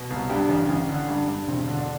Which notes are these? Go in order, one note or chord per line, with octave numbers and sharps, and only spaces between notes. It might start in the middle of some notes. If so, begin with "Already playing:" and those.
Already playing: B2
C2
G2 G4
A1
A1
D3
G2
G2
E1 C4
D3
D4